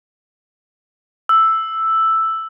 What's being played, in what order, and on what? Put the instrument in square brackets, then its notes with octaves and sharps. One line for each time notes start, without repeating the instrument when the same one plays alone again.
[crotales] E6